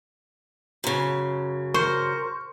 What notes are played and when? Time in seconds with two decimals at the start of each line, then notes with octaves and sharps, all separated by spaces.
0.84 F#2 C#3
1.74 A#4 C5 C#6